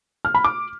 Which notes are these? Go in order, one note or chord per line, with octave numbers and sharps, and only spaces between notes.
F6
B5
D6